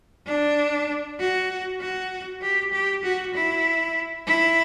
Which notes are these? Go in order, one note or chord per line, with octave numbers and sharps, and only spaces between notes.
D4
F#4
F#4
G4
G4
F#4
E4
E4